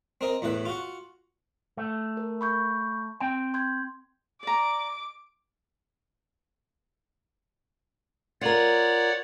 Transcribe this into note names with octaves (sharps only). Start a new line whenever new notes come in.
C4 A#4 D#5
E2 A2 E4 B4
F4 F#4
A3
A#4
B5 C#6 G6
C4 G5 C6
C6 G6 G#6
D5 A#5 D6
F4 A#4 C#5 D5 F#5